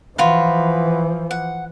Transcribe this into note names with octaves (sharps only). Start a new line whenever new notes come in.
E3 F3 F4 F#4 B4
F#5